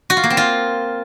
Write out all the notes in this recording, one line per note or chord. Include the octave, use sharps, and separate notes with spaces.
F#4
F4
A#3
C4
F4